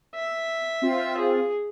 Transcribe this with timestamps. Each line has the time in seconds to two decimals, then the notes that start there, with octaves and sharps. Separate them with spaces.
0.15 E5
0.82 C4 F4
1.18 G#4